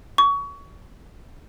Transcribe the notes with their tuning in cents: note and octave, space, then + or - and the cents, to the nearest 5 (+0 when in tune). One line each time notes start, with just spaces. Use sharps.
C#6 +25